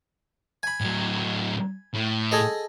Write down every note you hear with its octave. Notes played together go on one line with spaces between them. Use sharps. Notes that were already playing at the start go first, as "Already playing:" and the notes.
G#5 B5
A2 F#3
A2
G#4 A4 D#5